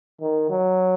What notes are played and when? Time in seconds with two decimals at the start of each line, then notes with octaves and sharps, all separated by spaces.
0.21 D#3
0.50 F#3